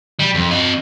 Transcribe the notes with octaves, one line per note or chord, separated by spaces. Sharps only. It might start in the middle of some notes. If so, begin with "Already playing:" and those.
G3
F2
C4 D#5